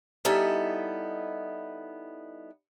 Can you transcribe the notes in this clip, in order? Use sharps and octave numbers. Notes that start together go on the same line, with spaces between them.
G3 B3 D#4 E4 A4 G#5